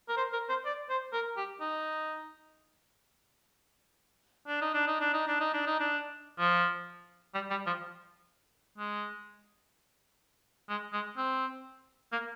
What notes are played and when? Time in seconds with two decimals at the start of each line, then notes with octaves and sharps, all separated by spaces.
0.09 A#4
0.17 C5
0.33 A#4
0.49 C5
0.65 D5
0.89 C5
1.13 A#4
1.37 G4
1.61 D#4
4.48 D4
4.61 D#4
4.74 D4
4.87 D#4
5.01 D4
5.14 D#4
5.27 D4
5.40 D#4
5.53 D4
5.66 D#4
5.80 D4
6.39 F3
7.34 G3
7.50 G3
7.66 F3
8.78 G#3
10.69 G#3
10.93 G#3
11.17 C4
12.12 A#3